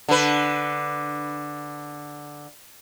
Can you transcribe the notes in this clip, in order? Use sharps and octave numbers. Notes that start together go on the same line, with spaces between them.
D3 B4